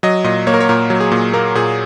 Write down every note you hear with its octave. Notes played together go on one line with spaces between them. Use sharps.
F#3 D#5
A#2 D#5
A#3 C#5
A#4
C#5
A#2 A#4
F#3
G#4
A#2
A#3 A#4
A#2 G#4